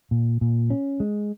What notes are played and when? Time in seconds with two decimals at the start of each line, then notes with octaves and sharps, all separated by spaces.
0.11 A#2
0.41 A#2
0.70 C#4
1.00 G#3